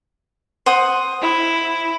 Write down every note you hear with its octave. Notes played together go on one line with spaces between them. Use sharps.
C5 F#5 D#6
E4